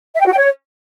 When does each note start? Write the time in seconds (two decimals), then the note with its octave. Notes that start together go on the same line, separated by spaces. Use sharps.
0.15 E5
0.20 G5
0.26 F#4
0.32 G5
0.38 C#5